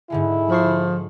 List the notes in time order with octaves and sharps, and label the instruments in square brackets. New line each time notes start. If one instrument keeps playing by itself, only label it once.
[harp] G#2 D3 G#3 [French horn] E4
[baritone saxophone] F3 [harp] B5 C#6 C7